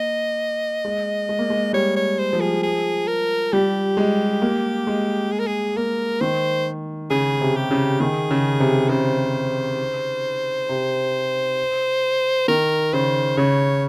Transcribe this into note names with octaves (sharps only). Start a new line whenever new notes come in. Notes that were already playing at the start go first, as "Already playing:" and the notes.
Already playing: A#3 D#5
G#3
G#3
A#3
G#3
G3 C#5
C#5
C5
F3
G#4
G#4
A#4
G3 G4
G#3
A#3
G#3
G#4
A#4
G#4
A#3 A#4
D#3 C5
C#3 G#4
C3
G4
C#3
D#3 G#4
C#3
C3
C#3 C5
C3
D#3 A#4
C#3 C5
C#3 C#5